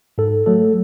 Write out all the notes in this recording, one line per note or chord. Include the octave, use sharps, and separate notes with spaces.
G#2 A4
F#3 A3 A4